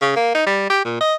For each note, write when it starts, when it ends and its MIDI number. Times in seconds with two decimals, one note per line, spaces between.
0.02 0.11 49
0.16 0.31 58
0.34 0.44 63
0.46 0.66 55
0.70 0.80 67
0.84 1.00 46
1.01 1.15 75